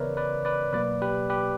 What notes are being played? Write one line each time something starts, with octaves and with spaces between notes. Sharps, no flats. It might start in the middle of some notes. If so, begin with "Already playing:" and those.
Already playing: C#3 E3 B3 A#4 B4 C#5 D5 E5
B4 D5
B4 D5
B2 F#3 A#3 B4 D5
G4 B4
G4 B4